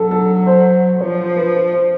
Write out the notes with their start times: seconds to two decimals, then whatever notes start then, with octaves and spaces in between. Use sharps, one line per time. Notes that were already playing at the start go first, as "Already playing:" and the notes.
Already playing: F#3 A4
0.11 A4
0.47 C5
1.00 F3 C#5
1.37 B4
1.54 C5
1.72 C5